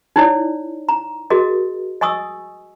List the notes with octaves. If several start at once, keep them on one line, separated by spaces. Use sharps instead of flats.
D#4 E4 C#5 D5
A#5
F#4 G#4 A#4 D#5
D#5 G#5 C#6 D#6 E6